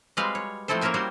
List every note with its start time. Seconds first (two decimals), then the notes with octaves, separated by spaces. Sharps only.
0.17 G3 G#3 C4 F#4 B4 F5
0.35 C#5
0.68 F3 A3 C4 E4 A4 C5
0.81 A#3 C4 C#4 A#4 E5 G#5
0.94 G3 F#4 C5 C#5